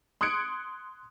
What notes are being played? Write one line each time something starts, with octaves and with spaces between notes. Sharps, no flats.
C6 D#6 F#6 G#6 C#7 D7